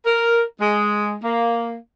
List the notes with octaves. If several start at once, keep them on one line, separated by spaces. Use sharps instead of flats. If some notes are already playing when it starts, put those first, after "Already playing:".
A#4
G#3
A#3